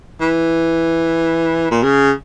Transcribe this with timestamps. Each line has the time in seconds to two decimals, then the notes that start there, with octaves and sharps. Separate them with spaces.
0.21 E3
1.71 A#2
1.83 C#3